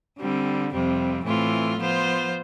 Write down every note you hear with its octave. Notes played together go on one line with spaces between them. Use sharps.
D3 G3 C4
F2 C3 G3 C4
A2 E3 A3 C4 F4
F3 B3 F4 C5